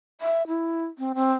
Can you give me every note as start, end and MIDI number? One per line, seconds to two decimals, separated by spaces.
0.21 0.47 76
0.48 0.86 64
0.98 1.13 60
1.15 1.34 60